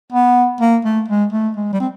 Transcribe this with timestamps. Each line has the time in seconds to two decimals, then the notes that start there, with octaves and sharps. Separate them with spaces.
0.12 B3
0.61 A#3
0.85 A3
1.08 G#3
1.33 A3
1.57 G#3
1.73 G3
1.80 C4